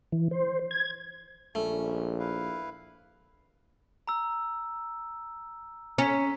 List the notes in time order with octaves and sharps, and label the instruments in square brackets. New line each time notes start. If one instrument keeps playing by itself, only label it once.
[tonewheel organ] E3
C5
G#6
[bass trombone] A#1 [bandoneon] G3 C#4 [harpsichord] A3
[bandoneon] E4 B4 F5
[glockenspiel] A#5 E6
[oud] C#4 [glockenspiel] A#5 B6